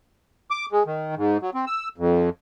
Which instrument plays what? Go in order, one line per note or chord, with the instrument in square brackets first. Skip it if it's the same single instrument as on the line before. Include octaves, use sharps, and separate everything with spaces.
[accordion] D6
G#3
D#3
G#2
F#3
C4
E6
F2